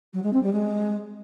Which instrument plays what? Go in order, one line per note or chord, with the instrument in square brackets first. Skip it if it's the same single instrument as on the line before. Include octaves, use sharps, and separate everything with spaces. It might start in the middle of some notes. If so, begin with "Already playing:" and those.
[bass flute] F#3
G#3
C4
G3
G#3